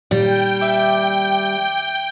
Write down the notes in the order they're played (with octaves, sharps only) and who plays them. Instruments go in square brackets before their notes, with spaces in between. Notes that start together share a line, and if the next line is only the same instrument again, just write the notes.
[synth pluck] A#2 D#3 [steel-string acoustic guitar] G3 [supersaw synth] G5
[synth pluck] E5 D6